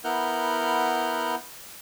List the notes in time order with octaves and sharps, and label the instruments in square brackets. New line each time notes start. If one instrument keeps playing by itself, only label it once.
[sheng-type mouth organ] B3 E4 A#4 F#5 F6 G6